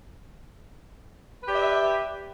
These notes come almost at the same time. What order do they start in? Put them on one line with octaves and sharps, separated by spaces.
B4 G4 D5 E5